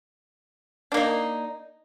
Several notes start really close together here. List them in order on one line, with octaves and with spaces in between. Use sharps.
D4 A#3 D#4